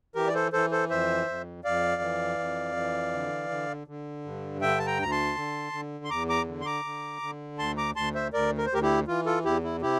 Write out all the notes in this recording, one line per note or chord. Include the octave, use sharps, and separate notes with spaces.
E3 G4 A#4
D5
A4 C5
E3 A4 C5
A4 C5
F2 C5 E5
F2
F2 D5 F5
E3
F2
E3
D3
D3
D3
G2
D3 E5 G5
A5
G5 A#5
D2 A#5
A5 C6
D3
D3
C6
E2 A#5 D6
A#5 D6
D3
C6
A#5 D6
D3
D3
D2 A5 C6
A#5 D6
D2 A5 C6
C5 E5
D2 A#4 D5
A#4
C5
D2 G4 A#4
E4 G4
E3 F4
F4 A4
E2 E4 G4
E4
C3 E4 G4